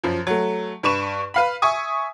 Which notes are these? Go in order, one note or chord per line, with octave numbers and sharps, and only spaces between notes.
F#2 F3
F#3 A3
G2 B4 C#6 E7
B4 F5 B5
E5 G#5 C#6 D#6